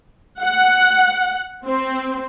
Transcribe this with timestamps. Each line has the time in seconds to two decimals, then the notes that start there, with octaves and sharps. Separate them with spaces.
0.41 F#5
1.66 C4